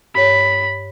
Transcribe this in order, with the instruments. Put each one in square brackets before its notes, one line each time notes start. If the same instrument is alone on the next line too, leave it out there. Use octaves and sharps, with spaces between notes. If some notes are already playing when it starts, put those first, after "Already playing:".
[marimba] G2 C#5 [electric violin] B5